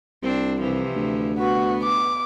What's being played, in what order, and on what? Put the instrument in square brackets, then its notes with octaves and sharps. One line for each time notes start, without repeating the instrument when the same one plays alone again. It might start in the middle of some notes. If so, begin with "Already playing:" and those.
[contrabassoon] C2 [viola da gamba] C4 D4
[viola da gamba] C3 E3 F3
[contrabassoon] D2
[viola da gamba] B3 B4 [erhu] F#4
[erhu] D6